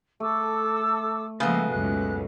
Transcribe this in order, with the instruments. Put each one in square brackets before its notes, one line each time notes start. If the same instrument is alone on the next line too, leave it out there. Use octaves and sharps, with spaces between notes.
[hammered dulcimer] A3 [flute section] A4 D6 E6
[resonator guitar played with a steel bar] C#3 B3 [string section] F3 G#3 A#3 [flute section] E5
[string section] C#2 F#2 B2 [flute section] F#6